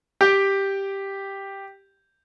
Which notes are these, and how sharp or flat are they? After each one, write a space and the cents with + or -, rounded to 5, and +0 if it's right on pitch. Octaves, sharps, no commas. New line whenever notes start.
G4 +0 G5 +0